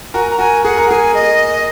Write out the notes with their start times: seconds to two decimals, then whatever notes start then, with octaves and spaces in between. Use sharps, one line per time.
0.14 F#4 A#4 G#5
0.30 A#5
0.39 F#4 A#4 G#5
0.64 G#4 F#5
0.77 A#4
0.90 G#4 G#5
1.14 D#5